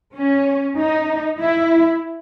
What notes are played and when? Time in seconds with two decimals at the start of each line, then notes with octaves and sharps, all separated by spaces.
0.15 C#4
0.77 D#4
1.40 E4